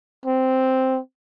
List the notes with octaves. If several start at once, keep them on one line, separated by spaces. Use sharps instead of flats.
C4